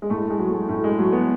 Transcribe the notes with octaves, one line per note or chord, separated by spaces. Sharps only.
G#3
A2 A3
G#3
F#3
A3
A2 A3
G#3
F#3 A3
B3